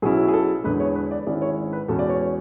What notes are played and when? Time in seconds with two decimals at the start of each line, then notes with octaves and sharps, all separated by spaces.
0.02 B1 B2 F#3 C#4 E4 G#4
0.28 G#4
0.33 A4
0.64 E1 E2 D3 G#3 B4
0.80 C#5
0.95 B4
1.11 D5
1.26 G#1 G#2 G#3 C#4 E4 D5
1.42 C#5
1.73 B4
1.88 E2 B2 G#3 C#4 A4
1.99 D5
2.09 C#5
2.21 C#5